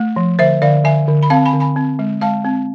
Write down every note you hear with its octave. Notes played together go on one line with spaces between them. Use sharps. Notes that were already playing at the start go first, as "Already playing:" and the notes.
Already playing: A3
F3
D3 C5 E5
D3 D5 F5
D3 E5 G#5
D3
B5
C4 F5 A5
G#5 B5
D3
G#5 B5
C4
G#3
G#3 F5 A5
C4